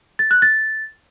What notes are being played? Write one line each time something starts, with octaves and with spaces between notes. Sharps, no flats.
A6
F#6
A6